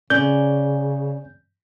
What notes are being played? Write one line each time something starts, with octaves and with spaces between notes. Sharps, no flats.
C#3 C#4 D5 G6